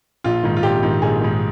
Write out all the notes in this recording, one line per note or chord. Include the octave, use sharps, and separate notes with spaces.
A#1 F4
G#2 D#3
F4
A#1 G4
G#2 D#3
A#1 G#4
G#2 D#3